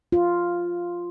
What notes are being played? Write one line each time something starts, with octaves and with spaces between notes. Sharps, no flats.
F4